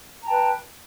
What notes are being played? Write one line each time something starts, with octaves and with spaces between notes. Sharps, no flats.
B4 G5 A5 A#5